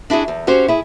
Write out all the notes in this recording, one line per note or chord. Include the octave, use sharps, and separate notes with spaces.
D4 E4 F#4 G#4
E2
C#4 F#4 G4 C5
E4 G#4